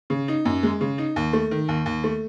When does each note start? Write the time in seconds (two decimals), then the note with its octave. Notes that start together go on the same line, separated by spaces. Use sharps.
0.10 C#3
0.28 D#4
0.45 F#2
0.63 G#3
0.81 C#3
0.98 D#4
1.16 D#2
1.33 A3
1.51 D#3
1.69 D#2
1.86 D#2
2.04 A3